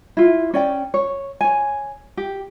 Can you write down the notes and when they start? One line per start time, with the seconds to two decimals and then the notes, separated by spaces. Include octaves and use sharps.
0.17 E4 F4
0.54 C#4 D5 G5
0.94 C#5
1.41 C#5 G#5
2.17 G4